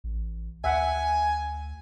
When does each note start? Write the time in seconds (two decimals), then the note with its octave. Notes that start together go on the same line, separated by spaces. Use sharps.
0.04 A1
0.64 D2 E5 F#5 G#5